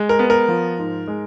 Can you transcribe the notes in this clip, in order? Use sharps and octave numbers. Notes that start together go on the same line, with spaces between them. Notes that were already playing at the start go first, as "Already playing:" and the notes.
Already playing: G#3
A#4
B3
A#4
F3
G#2
G#3